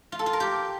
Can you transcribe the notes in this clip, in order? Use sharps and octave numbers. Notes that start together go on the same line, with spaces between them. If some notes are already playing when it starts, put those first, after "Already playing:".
F4
A4
F4
A#4
G4